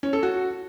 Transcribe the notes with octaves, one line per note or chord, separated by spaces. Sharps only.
C#4
A4
F#4